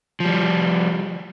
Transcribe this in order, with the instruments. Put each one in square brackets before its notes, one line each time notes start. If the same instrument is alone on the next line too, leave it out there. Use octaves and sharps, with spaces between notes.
[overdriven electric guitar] F3 G3